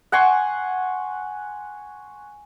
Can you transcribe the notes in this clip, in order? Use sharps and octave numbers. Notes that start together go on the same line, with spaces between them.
F#5 G#5 C6 C#6